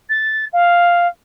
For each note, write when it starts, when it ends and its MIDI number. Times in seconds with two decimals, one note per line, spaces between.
0.09 0.45 93
0.53 1.07 77